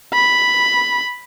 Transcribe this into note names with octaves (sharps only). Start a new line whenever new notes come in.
B5